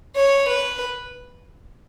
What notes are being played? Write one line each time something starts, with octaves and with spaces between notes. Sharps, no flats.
C#5
B4